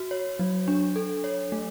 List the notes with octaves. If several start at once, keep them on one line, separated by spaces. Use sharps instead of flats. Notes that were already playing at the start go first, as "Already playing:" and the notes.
Already playing: F#4
C#5
F#3
D4
A4
C#5
A3